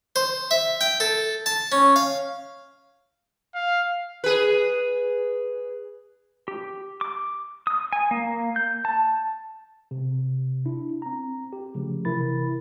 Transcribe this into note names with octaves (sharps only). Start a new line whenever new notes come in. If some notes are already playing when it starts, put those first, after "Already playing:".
C5
E5
G5
A4
A5
C#4
F5
F5
G#4 B4
G4
D6
D#6
G#5
A#3
G6
A5
C3
D4 E4
C4 A#5
G4
C#3 F3 A3
C3 E3 E4 A#4 B5 A6